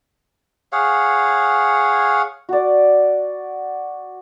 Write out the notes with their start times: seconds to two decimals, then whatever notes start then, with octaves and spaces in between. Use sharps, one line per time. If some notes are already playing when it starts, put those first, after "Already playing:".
0.72 G#4 C#5 F5 F#5
2.49 F#4 D5